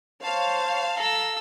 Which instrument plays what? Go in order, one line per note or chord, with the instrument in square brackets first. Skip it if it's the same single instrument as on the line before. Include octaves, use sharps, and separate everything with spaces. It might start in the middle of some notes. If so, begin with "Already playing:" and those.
[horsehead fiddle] C5 C#5 [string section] F5 [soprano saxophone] A5
[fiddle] A4 E6 [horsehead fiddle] A#5